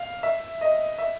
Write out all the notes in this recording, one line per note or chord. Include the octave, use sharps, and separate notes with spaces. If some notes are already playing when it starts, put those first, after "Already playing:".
Already playing: F5
E5
D#5
E5